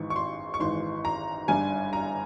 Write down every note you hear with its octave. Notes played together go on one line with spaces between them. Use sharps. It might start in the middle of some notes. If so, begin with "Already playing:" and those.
Already playing: G#1 G#2 E3 C#6
C#6
C6
C#6
G#1 G#2 E3 C6
A#5
G1 G2 G3 G#5
A#5